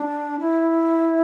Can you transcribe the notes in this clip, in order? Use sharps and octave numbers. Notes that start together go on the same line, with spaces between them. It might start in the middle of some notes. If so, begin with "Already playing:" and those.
Already playing: D4
E4